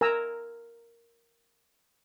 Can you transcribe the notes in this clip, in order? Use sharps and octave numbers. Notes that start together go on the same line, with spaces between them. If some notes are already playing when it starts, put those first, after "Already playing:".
A#4 G#5 A#5 E6